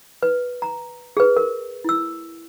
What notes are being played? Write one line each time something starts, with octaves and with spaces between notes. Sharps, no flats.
B4
A#5
G#4 B4
A#4
E4 E6